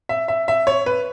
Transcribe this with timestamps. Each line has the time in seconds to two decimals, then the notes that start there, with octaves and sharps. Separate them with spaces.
0.09 E5
0.28 E5
0.48 E5
0.67 C#5
0.86 B4